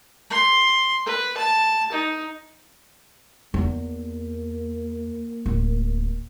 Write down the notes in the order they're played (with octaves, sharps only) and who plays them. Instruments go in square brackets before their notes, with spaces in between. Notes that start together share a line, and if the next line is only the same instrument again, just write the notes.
[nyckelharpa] C6
B4
A5
D#4
[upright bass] E2 D#4 [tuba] A#3
[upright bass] D1